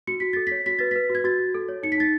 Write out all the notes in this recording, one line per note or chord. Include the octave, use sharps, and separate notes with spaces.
F#4 C#7
F#4 B6
A4 A6
C#5 B6
F#4 B6
B4 A6
B4 B6
F#4
G#6
F#4 A6
F#4
A4
C#5
D#4 C#7
B6
D#4 A6